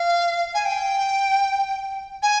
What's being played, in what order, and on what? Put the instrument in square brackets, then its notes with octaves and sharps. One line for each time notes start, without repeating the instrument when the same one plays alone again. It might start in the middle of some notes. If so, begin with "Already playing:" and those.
Already playing: [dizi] F5
G#5
G5
G#5